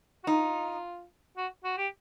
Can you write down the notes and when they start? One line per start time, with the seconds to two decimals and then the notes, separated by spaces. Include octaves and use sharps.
0.24 F#4
0.27 D#4 F4
1.37 F#4
1.64 F#4
1.78 G4